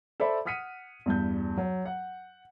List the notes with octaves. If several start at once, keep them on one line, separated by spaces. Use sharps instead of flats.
A4 C5 D5 E5 B5
F#5 D#6 F6 B6 C#7 D#7
E2 G2 G6
F#3
F#5